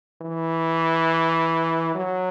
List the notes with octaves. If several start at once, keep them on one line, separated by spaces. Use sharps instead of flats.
E3
F#3